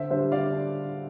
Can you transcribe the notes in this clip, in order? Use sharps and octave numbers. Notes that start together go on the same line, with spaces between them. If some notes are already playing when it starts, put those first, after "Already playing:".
Already playing: D3 C5 E5
G3 D4 C5 E5
D3 D5 F5
D4